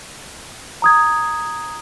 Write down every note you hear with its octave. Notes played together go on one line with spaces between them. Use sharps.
A#5 D#6 G#6